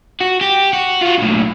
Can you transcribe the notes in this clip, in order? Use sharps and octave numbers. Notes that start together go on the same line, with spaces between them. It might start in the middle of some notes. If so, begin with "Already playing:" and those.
F#4
G4
F#4
F4 F#4
B1 A2